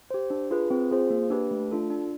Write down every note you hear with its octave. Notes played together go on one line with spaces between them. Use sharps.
G4 C5
D4
F4 G#4 B4
C4
F4 G#4 C5
A#3
D4 G4 B4
A3
D4 F4 A4
D4